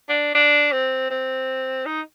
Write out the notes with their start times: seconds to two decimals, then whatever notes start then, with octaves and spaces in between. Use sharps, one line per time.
0.09 D4
0.35 D4
0.72 C4
1.10 C4
1.86 D#4